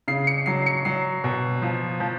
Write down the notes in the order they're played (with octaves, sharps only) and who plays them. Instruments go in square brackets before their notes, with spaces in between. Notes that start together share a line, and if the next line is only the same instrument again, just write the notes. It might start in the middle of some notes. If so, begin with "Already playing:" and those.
[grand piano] C#3 C7
C#7
F#3 C7
C#7
F#3 C7
B2
F3
F3